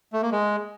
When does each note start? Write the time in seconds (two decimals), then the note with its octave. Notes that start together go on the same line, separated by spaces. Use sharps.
0.13 A3
0.22 A#3
0.32 G#3